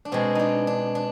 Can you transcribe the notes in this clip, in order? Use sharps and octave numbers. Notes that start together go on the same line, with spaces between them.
D4
B2 G#3 C4
D4 D#4
D4
D4